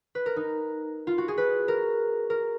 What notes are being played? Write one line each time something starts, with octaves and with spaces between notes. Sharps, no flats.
B4
A#4
D#4
F4
F#4
G#4
B4
A#4
A#4